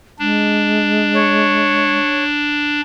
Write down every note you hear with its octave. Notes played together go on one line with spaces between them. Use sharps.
G#3 D4
C#5